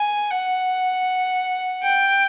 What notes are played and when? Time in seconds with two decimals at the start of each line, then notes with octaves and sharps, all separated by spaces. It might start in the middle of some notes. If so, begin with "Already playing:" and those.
Already playing: G#5
0.31 F#5
1.83 G5